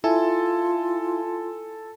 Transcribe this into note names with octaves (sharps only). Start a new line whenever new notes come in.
E4 F4 A4 G#5 A5